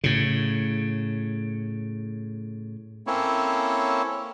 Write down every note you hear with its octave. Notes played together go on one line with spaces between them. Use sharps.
A2 C#3
A#3 C4 C#4 E4 A4 C#5